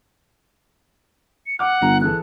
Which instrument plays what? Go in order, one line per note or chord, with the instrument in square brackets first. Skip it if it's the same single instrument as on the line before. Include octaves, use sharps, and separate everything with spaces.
[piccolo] C#7
[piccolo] F#5 [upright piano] D6 F6
[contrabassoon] G1 [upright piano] A#5
[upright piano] E3 G#4 A4 [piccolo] F#6